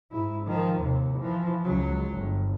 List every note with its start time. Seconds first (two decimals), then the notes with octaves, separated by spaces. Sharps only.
0.12 G#2 E4
0.46 D#3 F3
0.81 D#2 C3
1.19 E3 F3
1.64 C#2 F#3
2.14 G1